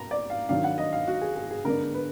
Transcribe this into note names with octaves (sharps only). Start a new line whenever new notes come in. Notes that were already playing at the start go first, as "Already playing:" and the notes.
Already playing: B2 A#3 A#5
D5
F5
D#3 F#3 D4 F5
F#5
D#5
F5
F#4
G#4
G#4
G#4
D3 G#3 B3 D4 A#4
B4